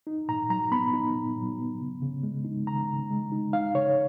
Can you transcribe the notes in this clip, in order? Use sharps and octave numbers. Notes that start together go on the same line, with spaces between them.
D#4
A#2 A#5
F#3 A#5
B3 B5
D#4
A#2
F#3
B3
C#3
C#3
G#3
D#4
C#3 A#5
C#3
G#3
D#4
D#4 F5
C#3 C#5